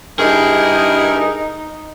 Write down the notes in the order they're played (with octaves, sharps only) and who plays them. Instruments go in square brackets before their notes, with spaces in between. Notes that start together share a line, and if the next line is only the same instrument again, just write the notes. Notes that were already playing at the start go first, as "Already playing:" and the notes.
[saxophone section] G2 E4 A#4 [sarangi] D#4 [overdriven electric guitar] G#4